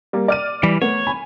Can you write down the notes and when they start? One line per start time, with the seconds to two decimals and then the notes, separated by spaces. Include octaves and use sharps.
0.13 G3 A#3
0.28 D5 F6 D#7
0.63 E3 G3
0.82 A3 B3 C#5
1.07 G#5 B5